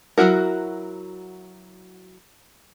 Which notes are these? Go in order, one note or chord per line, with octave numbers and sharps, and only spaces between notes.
F#3 A3 E4 F#4 A#4